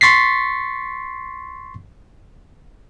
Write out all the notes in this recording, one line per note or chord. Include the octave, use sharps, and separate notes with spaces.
C6 C#6 A6 B6 C7